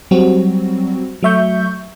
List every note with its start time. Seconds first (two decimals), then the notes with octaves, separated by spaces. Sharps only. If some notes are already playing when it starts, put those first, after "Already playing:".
0.11 F#3 G3 C4 F#4
1.23 F#3 A3 E5 C#6 G6